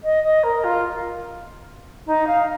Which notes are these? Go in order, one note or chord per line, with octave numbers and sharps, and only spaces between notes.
D#5
D#5
A#4
F4
D#4
F5